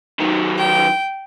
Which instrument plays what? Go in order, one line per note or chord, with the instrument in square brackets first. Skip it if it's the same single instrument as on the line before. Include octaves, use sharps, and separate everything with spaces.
[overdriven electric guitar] D#3 F#3
[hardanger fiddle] G5